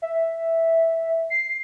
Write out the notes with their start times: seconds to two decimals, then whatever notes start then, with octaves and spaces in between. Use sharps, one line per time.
0.02 E5
1.30 C7